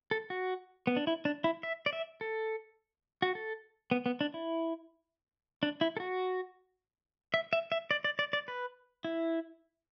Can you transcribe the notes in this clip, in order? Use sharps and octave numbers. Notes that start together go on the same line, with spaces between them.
A4
F#4
B3
D4
E4
D4
E4
E5
D5
E5
A4
F#4
A4
B3
B3
D4
E4
D4
E4
A4
F#4
E5
E5
E5
D5
D5
D5
D5
B4
E4